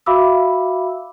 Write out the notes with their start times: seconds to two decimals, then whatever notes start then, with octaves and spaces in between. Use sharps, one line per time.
0.06 F#4 E5 F5 B5 D6 E6